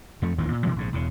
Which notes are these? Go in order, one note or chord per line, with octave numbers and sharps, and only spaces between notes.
F2 F3 A3
A1 D#2 D#3 F3
A#2
B2 E3 G3 A#3
A#1 G#2 C3
E1 E2 C#3